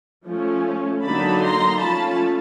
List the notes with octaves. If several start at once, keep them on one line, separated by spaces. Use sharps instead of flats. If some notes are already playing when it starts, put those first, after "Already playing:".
F3 A3 C#4
D3 F#3 A#3 D#4 A5 B5
A#5 C6
F3 A3 C#4 F4 A5 B5